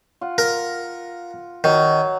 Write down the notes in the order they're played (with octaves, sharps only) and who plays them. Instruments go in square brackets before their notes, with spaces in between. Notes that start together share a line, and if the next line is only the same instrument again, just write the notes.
[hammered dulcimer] F4 F#5
[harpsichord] A#4
[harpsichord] D#3 [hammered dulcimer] F#3